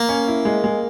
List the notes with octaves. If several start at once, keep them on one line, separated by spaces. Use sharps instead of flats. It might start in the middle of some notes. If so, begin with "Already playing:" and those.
Already playing: A#3
C#4
E4
G#3
G#3